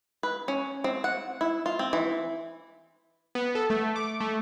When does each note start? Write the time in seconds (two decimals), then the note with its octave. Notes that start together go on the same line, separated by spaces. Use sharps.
0.23 B4
0.48 C#4
0.84 C4
1.04 F#5
1.41 E4
1.66 F4
1.79 C4
1.93 E3
3.35 B3
3.55 A4
3.70 A3
3.96 D6
4.21 A3